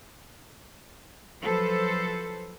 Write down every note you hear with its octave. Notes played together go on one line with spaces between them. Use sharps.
F3 F#3 A4 B4 C5